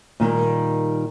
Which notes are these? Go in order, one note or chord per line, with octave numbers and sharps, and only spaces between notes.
A#2 D#3 G3 A#3